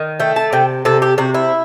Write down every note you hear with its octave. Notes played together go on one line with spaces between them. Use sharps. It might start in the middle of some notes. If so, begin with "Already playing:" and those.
Already playing: D#3
A3 G5
A5
C3 G5
C3 A4
G4
C3 F#4
E4